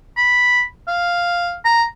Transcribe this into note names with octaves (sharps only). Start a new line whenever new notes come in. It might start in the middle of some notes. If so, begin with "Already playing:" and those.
B5
F5
A#5